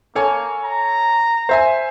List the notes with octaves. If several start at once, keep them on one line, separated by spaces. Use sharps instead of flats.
A#3 A4 C#5 G#5
A#5
C5 E5 G#5